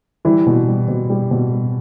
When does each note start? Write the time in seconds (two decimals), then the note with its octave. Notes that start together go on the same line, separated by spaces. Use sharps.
0.25 E3 G3 E4
0.47 B2
0.68 G3
0.88 B2
1.10 G3
1.31 B2
1.52 G3